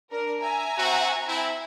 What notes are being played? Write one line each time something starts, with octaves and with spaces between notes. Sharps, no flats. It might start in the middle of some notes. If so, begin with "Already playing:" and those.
D4 A#4
E5 G#5 A#5
C4 F#4
C4 E4